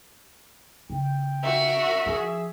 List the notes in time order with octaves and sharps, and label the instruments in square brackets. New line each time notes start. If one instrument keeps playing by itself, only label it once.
[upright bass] C#3 [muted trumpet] G5
[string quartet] F#4 A#4 [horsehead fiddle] E5
[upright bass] F3 [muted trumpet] G#4